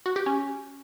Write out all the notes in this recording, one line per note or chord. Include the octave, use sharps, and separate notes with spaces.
F#4
G4
C#4